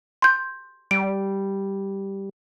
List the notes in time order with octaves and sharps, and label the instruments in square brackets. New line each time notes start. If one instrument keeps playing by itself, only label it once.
[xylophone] C6 G6
[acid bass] G3 [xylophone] D7